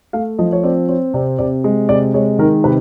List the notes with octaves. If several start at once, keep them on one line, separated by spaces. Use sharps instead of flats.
A3 F5
F3 D#5
C#5
C4 D5
C4 C#5
C3 D5
C3 D5
G#3
C3 D5
G#3 C#5
D#3 A#4
C3 B4